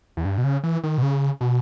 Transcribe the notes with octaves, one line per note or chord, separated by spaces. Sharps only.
E2
G2
B2
C#3
E3
D#3
B2
C#3
B2